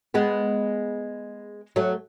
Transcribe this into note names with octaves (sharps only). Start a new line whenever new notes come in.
G#3 B3
F#3 A3